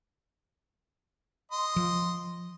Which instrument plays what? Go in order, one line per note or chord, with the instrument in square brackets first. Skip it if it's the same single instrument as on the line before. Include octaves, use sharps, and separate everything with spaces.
[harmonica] D#5 C6
[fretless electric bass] F3